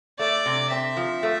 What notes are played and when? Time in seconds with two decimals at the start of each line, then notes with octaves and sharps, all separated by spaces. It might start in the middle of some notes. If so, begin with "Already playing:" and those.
0.19 A3 D5
0.46 C3
0.71 C4 E5
0.97 F3
1.23 A3